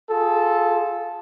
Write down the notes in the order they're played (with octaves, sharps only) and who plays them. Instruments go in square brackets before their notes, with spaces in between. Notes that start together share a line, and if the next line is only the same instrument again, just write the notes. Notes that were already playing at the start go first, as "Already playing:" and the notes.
[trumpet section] F4 G#4 A4